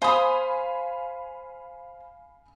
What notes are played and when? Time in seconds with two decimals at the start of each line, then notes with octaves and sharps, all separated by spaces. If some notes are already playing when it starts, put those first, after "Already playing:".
0.02 C5 F5 G#5 B5 D#6